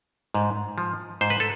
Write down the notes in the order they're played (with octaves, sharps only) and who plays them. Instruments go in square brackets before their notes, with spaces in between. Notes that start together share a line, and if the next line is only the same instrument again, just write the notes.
[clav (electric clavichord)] G#2
F3
G#2 C5
B4
A4